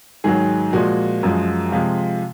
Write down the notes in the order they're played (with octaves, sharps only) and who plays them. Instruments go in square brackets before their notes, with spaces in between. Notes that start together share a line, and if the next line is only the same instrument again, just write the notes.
[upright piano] G#2 D#3 F#3 G#4
A#2 F3 G#3 F#4
F#2 F3 G#3
C3 F3 G#3 F4